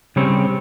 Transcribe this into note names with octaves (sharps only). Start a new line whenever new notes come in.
C#3 G3 C4 C#5